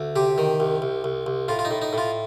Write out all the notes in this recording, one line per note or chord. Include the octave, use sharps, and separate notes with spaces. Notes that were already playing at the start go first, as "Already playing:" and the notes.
Already playing: D2
C3 G4
D#3
C2
C2
C2
C2
A2 F4
F4
D#4
A2
D#4
A2 F4